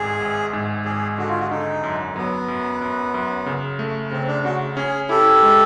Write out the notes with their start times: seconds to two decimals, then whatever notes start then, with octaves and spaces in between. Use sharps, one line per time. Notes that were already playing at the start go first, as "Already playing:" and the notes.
Already playing: G#1 G#2 G#4
0.20 G#1
0.53 G#2
0.85 G#1 G#4
1.18 D3 F#4
1.29 F4
1.39 F#4
1.51 D3 D#4
1.83 F#2
2.16 F#3 B3
2.48 F#2
2.81 F#2
3.14 F#2
3.46 C#3
3.79 A3
4.11 C#3 C4
4.27 D4
4.44 C#3 F#4
4.77 C#4 G#4
5.09 E4 G4 A4
5.42 G#3